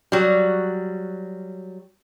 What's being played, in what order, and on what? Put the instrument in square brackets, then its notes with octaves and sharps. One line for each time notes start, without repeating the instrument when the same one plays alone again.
[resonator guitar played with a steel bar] F#3 G3